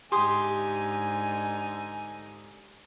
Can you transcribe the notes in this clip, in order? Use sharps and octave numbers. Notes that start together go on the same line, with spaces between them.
G#2 D3 D#4 G4 G#5 C6 D#6